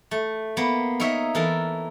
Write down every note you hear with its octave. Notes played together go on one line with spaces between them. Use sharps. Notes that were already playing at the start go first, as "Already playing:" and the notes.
A3
A#3 B3
D#4 A#4 C#5 E5
E3 A4 A#4 A5